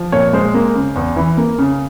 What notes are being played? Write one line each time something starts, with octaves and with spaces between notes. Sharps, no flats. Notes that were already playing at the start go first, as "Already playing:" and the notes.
Already playing: F3
A#2 C#5
G#3 C5
A#3
C#3
E2
E3
A#3
C#3